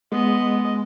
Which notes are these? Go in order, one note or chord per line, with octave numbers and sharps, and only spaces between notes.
G#3 B3 D#5